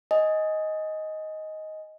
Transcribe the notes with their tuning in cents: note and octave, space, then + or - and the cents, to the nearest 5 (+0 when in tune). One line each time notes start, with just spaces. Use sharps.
D#5 +5 G#5 +0